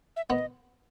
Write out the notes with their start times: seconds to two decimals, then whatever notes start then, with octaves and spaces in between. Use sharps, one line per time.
0.16 E5
0.29 B3 D#5